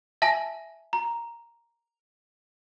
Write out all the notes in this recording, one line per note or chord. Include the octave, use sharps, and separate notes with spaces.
E5 G#5 A5 A#6
A#5